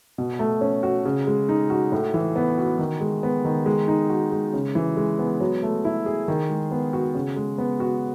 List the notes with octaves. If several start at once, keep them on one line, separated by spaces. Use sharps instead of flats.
B2
A3
C#4
F#4
C#3
G#3
D#4
F#4
A2
E3
B3
F#4
D#3
G#3
B3
D#3
G#3
D#4
F#4
G#3
C#3
E3
G#3
B3
F#3
A3
E4
G#4
D#3
G#3
B3
F#4
C#3
G#3
B3
F#4